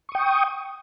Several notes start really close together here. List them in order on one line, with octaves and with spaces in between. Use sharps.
C#6 D#6 G5